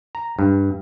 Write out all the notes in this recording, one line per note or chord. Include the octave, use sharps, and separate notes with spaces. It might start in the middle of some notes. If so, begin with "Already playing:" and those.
A#5
G2